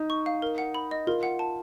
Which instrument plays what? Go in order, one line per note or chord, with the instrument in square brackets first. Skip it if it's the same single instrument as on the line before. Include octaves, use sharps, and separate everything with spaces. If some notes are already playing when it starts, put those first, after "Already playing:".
Already playing: [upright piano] D#4
[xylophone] C#6
F5
A#4
F#5
B5
D#5
[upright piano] F4 [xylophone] A#4
[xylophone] F#5
A5